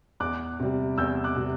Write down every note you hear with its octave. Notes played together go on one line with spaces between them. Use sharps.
E2 D6 F#6
C3 G3
E2 E6 G6
D6 F#6
C3 G3